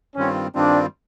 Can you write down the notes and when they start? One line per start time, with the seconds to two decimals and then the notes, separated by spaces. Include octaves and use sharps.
0.16 G2 D#3 G3 C4 C#4 F4
0.55 G2 D#3 G3 C4 D4 F4